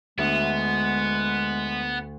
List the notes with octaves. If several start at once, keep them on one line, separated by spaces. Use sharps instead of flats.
D2 G#3 B3